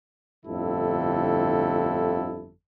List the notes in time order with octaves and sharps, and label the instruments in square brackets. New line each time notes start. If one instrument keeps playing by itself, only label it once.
[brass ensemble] G1 F2 A2 D3 E4 A4